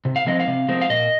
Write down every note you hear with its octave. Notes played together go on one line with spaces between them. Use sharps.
C3
F5
F3 G#3 C4 D#5
F5
C3
F3 G#3 C4
F5
A#2 D#5